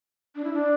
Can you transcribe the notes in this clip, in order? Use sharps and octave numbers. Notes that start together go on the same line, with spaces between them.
D4
E4
D4